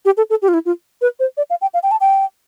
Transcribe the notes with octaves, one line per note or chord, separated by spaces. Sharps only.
G4
A4
A4
G4
F4
E4
F4
B4
C5
D5
F5
G5
F5
G5
A5
G5